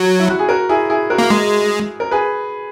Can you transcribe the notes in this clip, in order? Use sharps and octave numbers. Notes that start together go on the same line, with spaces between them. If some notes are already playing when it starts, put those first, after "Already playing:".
Already playing: F#3
E4
F#4
G#4
F#4 A#4
E4 G#4
E4 G#4
F#4 A#4
A#3
G#3
A#4
G#4 B4